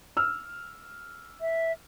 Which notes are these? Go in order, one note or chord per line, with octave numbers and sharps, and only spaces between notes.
E6 F6
E5